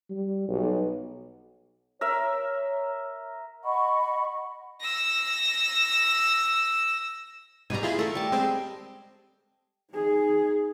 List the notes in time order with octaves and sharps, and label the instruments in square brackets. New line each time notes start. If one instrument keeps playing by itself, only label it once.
[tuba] G3
B1
[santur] A#4 E5 [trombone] C#5
[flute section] D#5 F#5 B5 C#6
[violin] E6 A#6
[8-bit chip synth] G#2 B2 G3 [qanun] G#5 A#5
[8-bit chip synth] E4 F4 G#4
[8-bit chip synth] A3 [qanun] A4 A#4
[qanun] G3 A5
[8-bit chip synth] G#3 C4
[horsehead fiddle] D#4 G#4